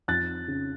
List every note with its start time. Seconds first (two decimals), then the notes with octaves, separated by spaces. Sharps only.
0.08 F2 F#6 A6
0.48 C#3